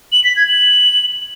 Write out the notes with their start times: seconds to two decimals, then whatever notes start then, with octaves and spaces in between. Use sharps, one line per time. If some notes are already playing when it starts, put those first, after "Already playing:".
0.12 F#7
0.24 B6
0.36 G#6
0.48 F#7